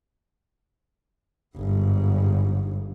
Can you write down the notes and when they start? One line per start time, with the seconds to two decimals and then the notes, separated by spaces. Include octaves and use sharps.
1.57 G1 G#2